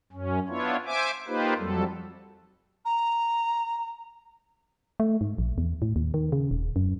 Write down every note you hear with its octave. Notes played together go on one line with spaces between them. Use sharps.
F#2 C#4
B3 D4 E4 F4 C#5
C5 E5 G#5 D6
A#3 D#4 F4 G4 B4 C5
F2 F#3 G3 A4
A#5
A3
G#2
A#1
E2
A2
D#2
D#3
C#3
D#1
F#2